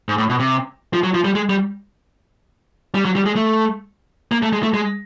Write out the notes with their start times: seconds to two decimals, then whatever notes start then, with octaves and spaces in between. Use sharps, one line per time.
0.09 G#2
0.18 A2
0.29 B2
0.39 C3
0.93 F3
1.04 F#3
1.14 F3
1.25 G3
1.35 G#3
1.50 G3
2.95 G3
3.05 F#3
3.16 G3
3.26 G#3
3.36 A3
4.32 A#3
4.43 A3
4.53 G#3
4.63 A3
4.74 G#3